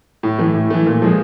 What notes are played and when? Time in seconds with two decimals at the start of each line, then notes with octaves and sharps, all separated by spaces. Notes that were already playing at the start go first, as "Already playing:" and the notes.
0.23 A2
0.38 E3 A3
0.54 A2
0.70 E3 A3
0.86 A#2
1.02 F3 G#3